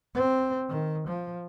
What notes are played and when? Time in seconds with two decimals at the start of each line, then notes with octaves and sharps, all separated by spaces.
0.14 C4
0.69 D#3
1.08 F3